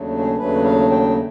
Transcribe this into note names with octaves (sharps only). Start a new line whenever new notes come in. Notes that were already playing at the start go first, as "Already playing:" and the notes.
Already playing: D#2 C#3 F#3 A3 D4
G#4
D#2 C#3 F#3 A3 D4 B4
F5
G5